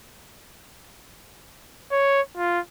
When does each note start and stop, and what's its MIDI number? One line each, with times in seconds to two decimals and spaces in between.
1.92 2.21 73
2.38 2.60 65